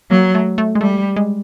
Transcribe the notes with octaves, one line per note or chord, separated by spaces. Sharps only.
F#3 A#3
A3
A3
G#3
G3 A3
G#3